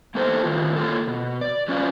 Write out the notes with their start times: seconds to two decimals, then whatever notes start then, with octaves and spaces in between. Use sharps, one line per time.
0.15 A#3 B3 D#4 A4 C5
0.44 A2 D#3 F4
0.76 A#3 F4 A4
1.07 B2
1.41 D5
1.68 F#3 C#4 F4 D5 F5